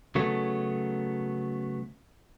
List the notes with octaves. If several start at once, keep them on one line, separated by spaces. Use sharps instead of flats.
C#3 F#3 A3 B3